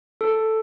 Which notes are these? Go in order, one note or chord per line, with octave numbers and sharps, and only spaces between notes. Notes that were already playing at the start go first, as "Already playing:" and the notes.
A4